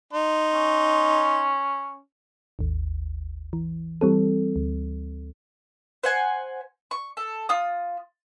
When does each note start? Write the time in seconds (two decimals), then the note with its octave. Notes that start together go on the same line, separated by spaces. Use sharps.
0.14 D#4 C6
0.53 C#4
2.59 G#1 D#2
3.53 E3
4.01 E3 G3 C4 A4
4.56 D2
6.04 C5 F#5 G#5
6.91 C#6
7.17 A4
7.49 F4 D#6